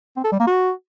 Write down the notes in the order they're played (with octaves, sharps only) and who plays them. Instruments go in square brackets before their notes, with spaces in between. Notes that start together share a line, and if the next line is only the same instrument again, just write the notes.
[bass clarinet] C4
A4
G3
A#3
F#4